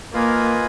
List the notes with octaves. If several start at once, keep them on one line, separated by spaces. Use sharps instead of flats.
A#3 F4 B4 D#5 G#5